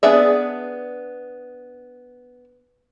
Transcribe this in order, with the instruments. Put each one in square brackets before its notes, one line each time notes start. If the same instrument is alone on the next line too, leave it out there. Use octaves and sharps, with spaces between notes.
[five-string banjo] B3 D4 G#4 D5 E5